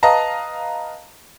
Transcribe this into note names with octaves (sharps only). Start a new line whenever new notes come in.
B4 D#5 F5 A5 A#5